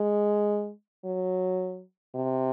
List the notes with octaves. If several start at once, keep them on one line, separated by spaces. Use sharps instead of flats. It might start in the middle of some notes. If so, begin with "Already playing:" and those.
Already playing: G#3
F#3
C3